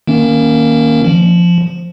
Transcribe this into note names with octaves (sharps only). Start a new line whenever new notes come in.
D#3 A#3 C#4
F3